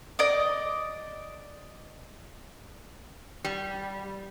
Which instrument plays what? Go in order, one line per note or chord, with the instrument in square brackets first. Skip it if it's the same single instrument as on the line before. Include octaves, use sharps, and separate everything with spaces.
[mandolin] D5 D#5 D6
[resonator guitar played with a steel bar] G3